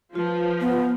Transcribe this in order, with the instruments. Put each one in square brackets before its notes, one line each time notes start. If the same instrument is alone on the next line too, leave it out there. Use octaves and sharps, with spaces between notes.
[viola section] F3 [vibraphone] F4 B4
[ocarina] B3